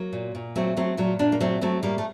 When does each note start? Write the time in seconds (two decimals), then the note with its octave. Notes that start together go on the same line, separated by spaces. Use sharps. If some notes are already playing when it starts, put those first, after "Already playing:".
Already playing: F#3 A#3
0.13 A#2
0.35 A#2
0.56 F#3 A3 C4
0.77 F#3 A3 C4
0.97 A#2 F#3 A3
1.19 A#2 A#3 D4
1.32 A#3
1.40 F#3 A3 C4
1.61 F#3 A3 C4
1.82 A2 G3 A#3
1.98 A3